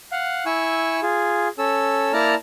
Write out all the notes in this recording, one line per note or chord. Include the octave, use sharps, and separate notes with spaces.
F5 F#5
E4 G#5 C#6 E6
F4 G#4
C#4 A4 E6
A#3 E4 D5 A5 A#5 F6